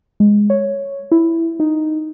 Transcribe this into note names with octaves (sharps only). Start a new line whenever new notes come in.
G#3
C#5
E4
D#4